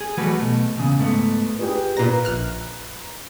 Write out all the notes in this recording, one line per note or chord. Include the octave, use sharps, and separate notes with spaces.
G#4
E3 F#3 G3 A3 F#4 B4
B2 A3
E2 A#2 C#3
G#2 A3 B3
G4 G#4 B4
A#2 B4 A#5 A#6
A#1 F6 F#6